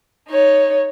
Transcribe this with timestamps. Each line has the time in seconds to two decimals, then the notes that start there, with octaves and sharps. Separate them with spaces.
0.29 D#4 C#5